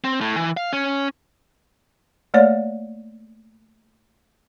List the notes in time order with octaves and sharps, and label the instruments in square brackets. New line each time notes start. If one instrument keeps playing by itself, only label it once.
[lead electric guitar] C4
A2
E3
F5
C#4
[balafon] A3 A#3 C#5 D5